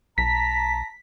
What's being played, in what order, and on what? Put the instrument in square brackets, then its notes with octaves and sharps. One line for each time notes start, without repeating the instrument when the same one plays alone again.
[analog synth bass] B1 [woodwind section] A5 A#5 [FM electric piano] B6